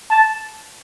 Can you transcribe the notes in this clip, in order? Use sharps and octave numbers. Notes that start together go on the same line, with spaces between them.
A5